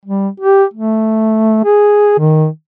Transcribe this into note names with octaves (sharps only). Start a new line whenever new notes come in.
G3
G4
A3
G#4
D#3